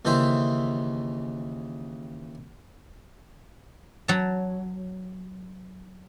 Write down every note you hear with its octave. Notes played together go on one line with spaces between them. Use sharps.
D#2 C#3 E3 C5 E5
F#3 A5